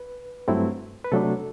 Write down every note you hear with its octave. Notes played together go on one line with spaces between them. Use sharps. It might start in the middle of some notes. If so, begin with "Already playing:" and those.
Already playing: B4
G2 F#3 A3 C4 E4
B4
C3 F#3 A3 D4 A4